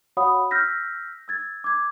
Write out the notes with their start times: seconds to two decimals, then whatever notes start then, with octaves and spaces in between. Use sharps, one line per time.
0.17 F#4 C#5 F5 F#5 B5 D#6
0.51 E6 F6 G6 A#6 B6
1.28 E6 G#6 A6
1.64 D6 G#6